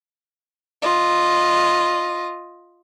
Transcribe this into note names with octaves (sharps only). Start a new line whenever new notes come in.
F4 D#5